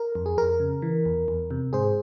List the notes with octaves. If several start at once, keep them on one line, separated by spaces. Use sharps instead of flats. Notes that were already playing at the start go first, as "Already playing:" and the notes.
Already playing: A#4
F2
G#4
F2 A#4
C#3
E3
E2
E2
C3
G#2 G#4 C5